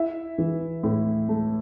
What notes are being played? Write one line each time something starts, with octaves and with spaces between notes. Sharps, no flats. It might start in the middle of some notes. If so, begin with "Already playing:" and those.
Already playing: E4 E5
E3
A2
A3